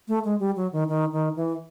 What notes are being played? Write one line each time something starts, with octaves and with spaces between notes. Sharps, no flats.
A3
G#3
G3
F#3
D#3
D#3
D#3
E3